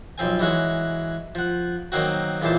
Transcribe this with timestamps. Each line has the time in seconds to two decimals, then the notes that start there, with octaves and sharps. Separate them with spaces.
0.18 B1 F3 C4 G#5
0.40 E3 G#3 F#4 C#5
1.35 F3 F#5
1.92 D#3 F#3 A#3 C4 F#4
2.42 C#2 A#2 E3 C5 A5